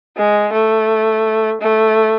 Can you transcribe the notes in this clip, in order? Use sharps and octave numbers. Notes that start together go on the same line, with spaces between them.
G#3
A3
A3